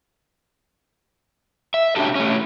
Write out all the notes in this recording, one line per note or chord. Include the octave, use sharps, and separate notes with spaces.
E5
B2 C#4 D4 F#4 G4 A4
A3 C#4